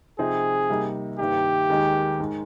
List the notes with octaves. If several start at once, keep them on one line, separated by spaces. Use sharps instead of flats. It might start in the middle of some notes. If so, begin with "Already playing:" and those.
C3 F3 C4 D#4 G#4
C3 G3 A#3 D#4
G2 D#3 A#3 D#4 G4
D#2 D#3 G#3 D#4
G#2 D#3 G#3